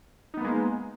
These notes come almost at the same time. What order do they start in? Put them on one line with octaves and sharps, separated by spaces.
D#4 B3 A#3 G#3